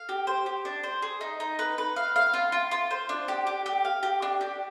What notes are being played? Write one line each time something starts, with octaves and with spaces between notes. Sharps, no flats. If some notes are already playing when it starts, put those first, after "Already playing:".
Already playing: F5
G4
C5
G4
D4
C5
G#4
D#4
D#4
B4
B4
F5
F5
F4
F4
F4
C5
D4
G4
G4
G4
F5
G4
D4
G4